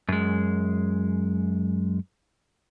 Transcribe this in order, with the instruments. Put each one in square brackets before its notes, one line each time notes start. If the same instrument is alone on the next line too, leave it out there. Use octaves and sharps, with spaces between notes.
[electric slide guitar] F#2 G#3